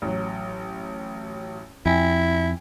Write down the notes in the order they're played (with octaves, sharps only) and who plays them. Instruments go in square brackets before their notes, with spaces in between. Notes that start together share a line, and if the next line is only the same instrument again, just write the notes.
[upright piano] A1 F#3
[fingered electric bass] F2 [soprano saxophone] E4 [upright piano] G5 G#5